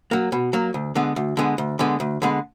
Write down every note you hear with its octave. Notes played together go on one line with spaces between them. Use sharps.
F#3 A#3
B2
F#3 A#3
D2
D3 G#3 B3
D2
D3 G#3 B3
D2
D3 G#3 B3
D2
D3 G#3 B3